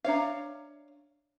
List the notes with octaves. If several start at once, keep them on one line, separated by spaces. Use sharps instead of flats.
D4 C#5 E5 F5 A#5